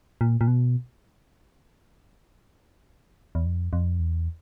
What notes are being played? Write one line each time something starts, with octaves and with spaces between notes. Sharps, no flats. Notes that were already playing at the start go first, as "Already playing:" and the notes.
A#2
A#2
B2
E2
F2
F2
E2